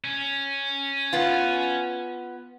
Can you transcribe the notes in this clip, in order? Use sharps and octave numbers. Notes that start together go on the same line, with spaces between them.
C#4
B3 F4